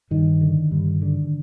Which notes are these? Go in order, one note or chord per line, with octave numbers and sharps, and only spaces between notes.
G2 D#3
D3
G2
D3